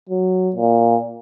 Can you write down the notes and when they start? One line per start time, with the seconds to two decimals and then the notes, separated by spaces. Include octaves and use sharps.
0.09 F#3
0.56 A#2